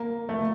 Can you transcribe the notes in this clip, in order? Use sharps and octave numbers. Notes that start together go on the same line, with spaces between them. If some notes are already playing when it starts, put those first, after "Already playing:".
Already playing: A#3
A3